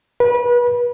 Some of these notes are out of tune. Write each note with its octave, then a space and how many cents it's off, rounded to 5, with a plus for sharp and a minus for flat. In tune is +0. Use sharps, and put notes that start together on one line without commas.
B4 -30